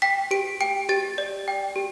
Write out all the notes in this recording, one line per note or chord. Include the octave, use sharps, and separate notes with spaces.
G5 B6
G4 D7
G5 D7
G4 A6
D5
G5
G4